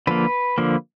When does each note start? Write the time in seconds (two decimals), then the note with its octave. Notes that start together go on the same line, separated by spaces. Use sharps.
0.07 D3 F3 A#3 B4
0.58 D3 F3 A#3